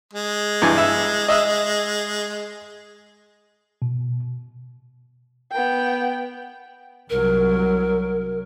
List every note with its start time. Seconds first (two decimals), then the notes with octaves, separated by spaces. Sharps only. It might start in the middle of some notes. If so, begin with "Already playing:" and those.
0.13 G#3
0.62 G2 E3 G#5
0.78 E5
1.29 D#5 E5
3.82 B2
5.52 B3 G5
7.10 C2 F#3 A#4